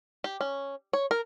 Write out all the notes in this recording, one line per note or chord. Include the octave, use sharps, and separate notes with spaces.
G4
C#4
C#5
A#4